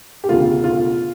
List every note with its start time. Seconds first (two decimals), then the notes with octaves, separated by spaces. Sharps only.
0.24 G4
0.29 E1 D2 C#3 F4
0.64 F4